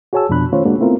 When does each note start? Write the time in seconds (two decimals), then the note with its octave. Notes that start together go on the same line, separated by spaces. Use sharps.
0.13 F#4 G#4 C#5 G#5 A5 E6
0.29 F2 B2 F3 D4 B5 F#6
0.52 D#3 A3 C#4 F4 C5 C#5
0.65 G#3 A#3 D4 F#4
0.79 A3 B3 C4 E4 F4 A#4